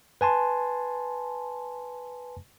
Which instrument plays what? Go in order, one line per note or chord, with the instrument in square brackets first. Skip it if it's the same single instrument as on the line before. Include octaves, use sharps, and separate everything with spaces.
[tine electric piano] B4 G#5 A5 C6